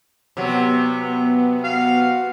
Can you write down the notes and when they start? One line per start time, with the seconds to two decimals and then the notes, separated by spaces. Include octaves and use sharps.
0.37 C3 F#3 B3
1.64 F#4 F5